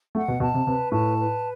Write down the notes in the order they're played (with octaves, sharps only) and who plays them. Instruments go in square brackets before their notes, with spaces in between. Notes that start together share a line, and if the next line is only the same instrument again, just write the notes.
[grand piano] A3 [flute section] F#5
[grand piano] B2
[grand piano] B2 [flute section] A5
[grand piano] C3
[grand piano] C3 [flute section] B4
[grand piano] A2 [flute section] A5
[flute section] B4